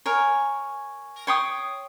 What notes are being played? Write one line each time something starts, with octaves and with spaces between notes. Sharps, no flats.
A#4 C#5 G#5
C#5 G5 C6 D#6